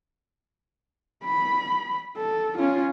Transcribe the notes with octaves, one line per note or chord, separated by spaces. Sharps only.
B5
A4
C#4 F4